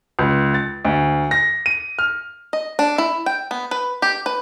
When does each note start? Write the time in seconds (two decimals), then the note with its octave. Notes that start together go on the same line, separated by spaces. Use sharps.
0.19 C#2
0.54 A6
0.85 D2
1.31 A#6
1.66 D#7
1.99 F6
2.53 D#5
2.79 D4
2.98 E4
3.26 G5
3.51 B3
3.71 B4
4.02 G4
4.26 B4